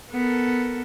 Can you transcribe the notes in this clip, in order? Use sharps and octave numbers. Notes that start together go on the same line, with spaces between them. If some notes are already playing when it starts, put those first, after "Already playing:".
B3 A4 A#4